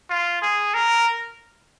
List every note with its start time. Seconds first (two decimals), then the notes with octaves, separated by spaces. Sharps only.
0.10 F4
0.42 G#4
0.74 A#4